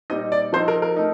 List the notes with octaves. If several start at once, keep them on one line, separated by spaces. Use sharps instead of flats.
A#2 G3 C4 D#4 D#5
D5
F3 C4 D#4 C5
A#4
A#4
A3 D#4